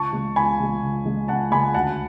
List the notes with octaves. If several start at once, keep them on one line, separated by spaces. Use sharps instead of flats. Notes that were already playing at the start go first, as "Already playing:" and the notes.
Already playing: C#2 A5 C#6
C#3 G#3
C#2 G#5 B5
C#3 G#3
C#2
C#3 G#3
C#2 F#5 A5
C#3 G#3 G#5 B5
D2 F#5 A5